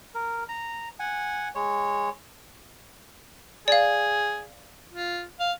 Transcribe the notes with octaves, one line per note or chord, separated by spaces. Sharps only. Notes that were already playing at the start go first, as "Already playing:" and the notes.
A#4
A#5
F#5 G#5
G#3 C#5
G#4 D5 F5
F4
F5